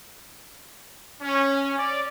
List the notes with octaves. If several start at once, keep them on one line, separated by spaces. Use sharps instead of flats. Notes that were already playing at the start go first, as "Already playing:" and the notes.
C#4
D5